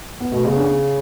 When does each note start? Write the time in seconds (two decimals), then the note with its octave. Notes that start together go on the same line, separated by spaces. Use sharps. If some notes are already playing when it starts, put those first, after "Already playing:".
0.20 B3
0.31 B2 A3
0.46 C#3 B3
0.57 D4
0.61 C#4